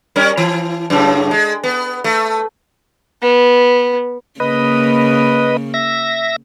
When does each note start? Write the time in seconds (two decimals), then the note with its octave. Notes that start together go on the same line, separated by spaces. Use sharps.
0.16 G3 C#4 A#4
0.37 E3
0.90 F#2 A2 C#3
1.31 G#3
1.64 B3
2.04 A3
3.22 B3
4.40 C#3 A#3 B4 D#5
5.74 E5 A#6